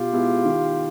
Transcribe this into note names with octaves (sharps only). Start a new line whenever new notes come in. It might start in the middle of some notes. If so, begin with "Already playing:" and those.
Already playing: B2 F4 G4
G#3 B3 E4 G#4
D#3